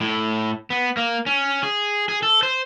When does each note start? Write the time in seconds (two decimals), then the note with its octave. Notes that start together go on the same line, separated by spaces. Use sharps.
0.01 A2
0.70 B3
0.97 A#3
1.26 C#4
1.63 G#4
2.09 G#4
2.23 A4
2.43 C5